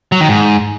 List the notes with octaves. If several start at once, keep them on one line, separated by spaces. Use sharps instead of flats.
F#3
D#3
G#2